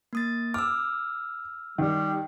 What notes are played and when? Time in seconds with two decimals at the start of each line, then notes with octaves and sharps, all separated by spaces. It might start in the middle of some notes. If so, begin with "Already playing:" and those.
0.13 A#3 D#6 A6
0.54 D6 E6 F6
1.78 D#3 G3